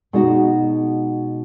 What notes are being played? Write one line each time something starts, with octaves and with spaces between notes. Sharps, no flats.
B2 G#3 D#4 F#4